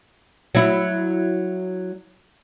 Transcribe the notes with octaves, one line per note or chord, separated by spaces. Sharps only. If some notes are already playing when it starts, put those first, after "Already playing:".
F#3 E4